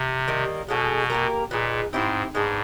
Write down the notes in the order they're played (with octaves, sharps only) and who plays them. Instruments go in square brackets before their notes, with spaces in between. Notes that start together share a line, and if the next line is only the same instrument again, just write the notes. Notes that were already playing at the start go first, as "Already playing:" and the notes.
Already playing: [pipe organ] C3
[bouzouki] D#3 G3 A#3
[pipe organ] B2 [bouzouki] G#3 C#4 F#4 A4
[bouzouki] A#3 D4 G4 A#4
[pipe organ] A#2 [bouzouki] B3 D#4 G#4
[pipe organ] G#2 [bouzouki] C4 E4 G4 C5
[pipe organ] G#2 [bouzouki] G#3 B3 D4